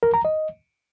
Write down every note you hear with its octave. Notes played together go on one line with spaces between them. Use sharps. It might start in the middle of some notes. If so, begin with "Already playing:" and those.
A#4
A#5
D#5